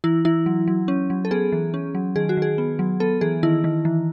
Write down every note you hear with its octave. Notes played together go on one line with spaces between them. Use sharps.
E3 E4
E3 E4
F#3
F#3
C#4
F#3
A4
B3 G#4
E3
C#4
F#3
D#3 G#4
F#4
D#3 G#4
B3
F#3
B3 A4
E3 G#4
D#3 E4
D#3
E3